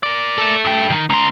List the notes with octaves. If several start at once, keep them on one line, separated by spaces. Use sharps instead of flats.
A#4 D5
A4 E5
G2 G5
D#3 D#4
C#2 B3 A#5 C6